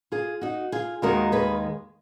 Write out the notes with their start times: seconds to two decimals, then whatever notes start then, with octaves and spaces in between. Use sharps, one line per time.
0.12 F4 G#4
0.42 D#4 F#4
0.72 F4 G#4
1.02 D#2 D#3 G#3 F#4 A#4
1.32 G#4 B4